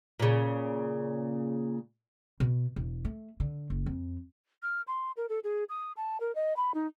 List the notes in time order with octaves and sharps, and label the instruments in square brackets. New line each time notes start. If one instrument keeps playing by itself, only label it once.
[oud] A#2 C#3
[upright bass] B2
E1
A3
D3
F#1
F2
[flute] F6
C6
A#4
A4
G#4
D#6
A5
A#4
D#5
B5
D#4